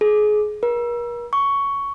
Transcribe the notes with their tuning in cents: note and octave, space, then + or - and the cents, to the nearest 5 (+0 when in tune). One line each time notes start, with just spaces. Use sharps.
G#4 +25
A#4 +40
C#6 +10